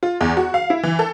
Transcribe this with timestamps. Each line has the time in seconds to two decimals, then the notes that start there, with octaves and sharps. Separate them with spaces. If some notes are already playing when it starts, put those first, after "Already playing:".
0.03 F4
0.21 E2
0.37 F#4
0.54 F5
0.70 E4
0.83 E3
0.99 A4